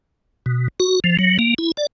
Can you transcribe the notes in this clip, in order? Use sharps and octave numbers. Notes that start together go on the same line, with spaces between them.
B2
F#4
F3
F#3
A#3
E4
D5